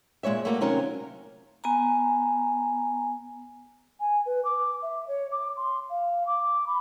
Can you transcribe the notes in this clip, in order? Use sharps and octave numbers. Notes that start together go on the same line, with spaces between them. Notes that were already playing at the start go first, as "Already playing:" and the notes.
A#2 G#3 C#5 E5
A3 A#3 F#4
C3 D#3 F#3 C#4 F4 A#4
B3 G#5 A#5
G#5
B4
D6
E5
C#5
D6
C6
F5
D6
B5